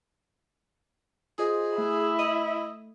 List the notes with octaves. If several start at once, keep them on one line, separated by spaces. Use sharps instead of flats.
F4 G#4 C5 D#5
A3 E4
D#5